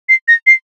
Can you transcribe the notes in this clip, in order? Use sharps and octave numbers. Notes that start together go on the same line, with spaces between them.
C7
A#6
C7